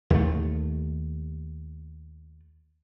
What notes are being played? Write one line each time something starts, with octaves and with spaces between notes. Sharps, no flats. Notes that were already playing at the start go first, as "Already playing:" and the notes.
D#2 A3